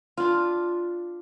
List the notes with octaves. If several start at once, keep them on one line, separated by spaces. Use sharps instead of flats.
D4 F4